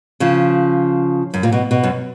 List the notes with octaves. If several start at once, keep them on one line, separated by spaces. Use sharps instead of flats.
C#3 F3
F#2
A#2
B2
B2
F#2